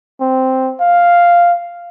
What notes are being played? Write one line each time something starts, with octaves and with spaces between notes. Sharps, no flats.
C4
F5